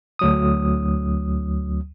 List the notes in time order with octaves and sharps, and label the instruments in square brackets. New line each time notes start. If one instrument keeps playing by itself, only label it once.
[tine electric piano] D2 F#3 D#6